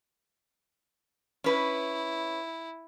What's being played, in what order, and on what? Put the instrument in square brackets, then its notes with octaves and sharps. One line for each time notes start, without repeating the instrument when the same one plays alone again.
[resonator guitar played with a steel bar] C#4 B4 [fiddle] E4